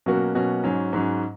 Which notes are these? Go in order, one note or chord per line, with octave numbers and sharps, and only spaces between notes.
B2 F#3 A#3 C#4 F#4
B2 F#3 A#3 C#4 F#4
G#2 F#3 C#4
G#2 F#3 C#4